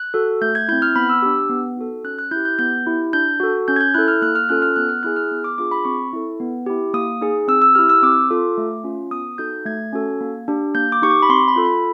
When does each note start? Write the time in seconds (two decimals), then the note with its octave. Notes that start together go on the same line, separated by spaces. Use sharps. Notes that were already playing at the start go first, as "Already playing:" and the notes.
Already playing: F#6
0.14 F#4 A4
0.41 A3 G6
0.55 G#6
0.68 C4 E4 G6
0.82 F6
0.95 B3 B5
1.09 E6
1.22 D4 G4 E6
1.49 B3
1.77 D#4 F#4 A4
2.04 C#4 F#6
2.19 F#6
2.31 E4 G6
2.36 G4
2.45 G6
2.58 B3 G6
2.86 E4 G4
3.13 D4 G6
3.40 F#4 A4
3.68 C#4 G6
3.76 G#6
3.81 G6
3.94 E4 A4 F#6
4.08 F6
4.22 A#3 F#6
4.35 F6
4.49 C#4 F4 A4 F#6
4.62 F6
4.76 B3 F#6
4.89 F6
5.03 E4 G#4 F#6
5.16 F6
5.31 B3
5.44 D6
5.58 D4 F4 G#4 D6
5.71 B5
5.85 C4 C#6
6.13 E4 A4
6.40 B3
6.66 E4 G4
6.93 A#3 D#6
7.21 D#4 G#4
7.48 C4 E6
7.62 E6
7.75 E4 G4 F6
7.89 E6
8.03 C4 D6
8.30 F4 A4
8.58 A3
8.84 C#4 F4
9.11 B3 D#6
9.38 D#4 F#4 A4 G6
9.65 A3 G#6
9.93 C#4 F#4 A4
10.20 A#3
10.48 D4 G4
10.75 A#3 G6
10.92 D6
11.02 D#4 G4 C#6
11.10 D6
11.23 B5
11.29 C4 C6
11.48 B5
11.56 F4 A4
11.65 B5